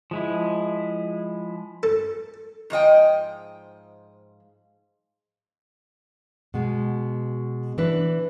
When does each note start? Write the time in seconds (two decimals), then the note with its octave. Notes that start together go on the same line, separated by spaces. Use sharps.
0.11 F3 G#3 E4
1.83 A4
2.70 G#2 F3 D#5 G5
6.54 B2 G#3
7.78 E3 D4 B4